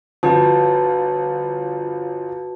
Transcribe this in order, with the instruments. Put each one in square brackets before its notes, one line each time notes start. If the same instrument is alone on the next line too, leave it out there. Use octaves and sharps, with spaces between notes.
[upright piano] G1 F3 [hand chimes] F#4 B4 A5